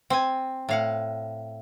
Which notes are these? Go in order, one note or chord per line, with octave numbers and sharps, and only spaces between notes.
C4 G#5
A2 F5 F#5